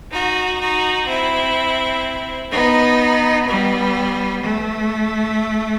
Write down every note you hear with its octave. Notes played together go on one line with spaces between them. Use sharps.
D#4 F#4
D#4 F#4
C4 E4
B3 D#4
G3 B3
A3